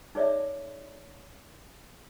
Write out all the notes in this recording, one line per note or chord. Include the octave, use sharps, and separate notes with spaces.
D#4 G#4 C#5 D5 E5